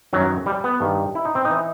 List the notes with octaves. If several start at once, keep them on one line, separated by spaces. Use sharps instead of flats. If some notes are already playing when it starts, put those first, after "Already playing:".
F#2 D#3 F#3
G3
B3
G2 D#3
E4
D#4
C4
E3 D#4